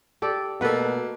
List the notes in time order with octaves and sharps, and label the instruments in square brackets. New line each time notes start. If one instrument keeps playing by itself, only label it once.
[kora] G4 A4 D5
[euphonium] B2 [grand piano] A3 A#3 [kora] A4 B4 F#5